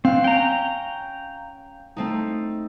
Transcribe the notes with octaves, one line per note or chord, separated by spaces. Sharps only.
C4 F5 F#5
C#4 G5 A#5
A3 C4 D#4